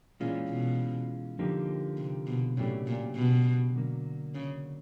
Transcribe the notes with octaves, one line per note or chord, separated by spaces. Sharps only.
A#2 E3 G#3 C#4 F4
B2
D3 F3 A#3 D#4 G4
C3
B2
A2 C#3 F#3 A#3 D4 G4
A#2
B2
D3 F#3 A#3
C#3